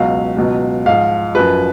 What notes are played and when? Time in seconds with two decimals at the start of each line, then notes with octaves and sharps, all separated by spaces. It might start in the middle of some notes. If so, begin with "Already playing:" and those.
Already playing: C#2 B2 F#3 F5
0.37 C#2 B2 F#3
0.86 G#2 F3 F5
1.35 F#2 F3 B4